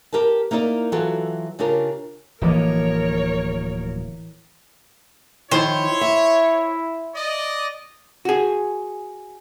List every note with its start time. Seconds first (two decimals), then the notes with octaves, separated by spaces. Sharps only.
0.13 G4 A#4 B4 A5
0.51 A#3 D#4 E4 A#4 D5
0.92 E3 F#3 F4 F#4 A4
1.59 C#3 D4 F4 G4 A#4
2.41 D1 E3 F3 A#3 A#4 C#5 D#5 D6
5.51 D#3 F3 E4 C5 C#5
6.01 E5
7.15 D5 D#5
8.25 F#4 G#4